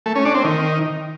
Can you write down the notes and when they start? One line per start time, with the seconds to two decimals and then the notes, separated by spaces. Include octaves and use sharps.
0.06 A3
0.15 C#4
0.25 D4
0.35 C4
0.44 D#3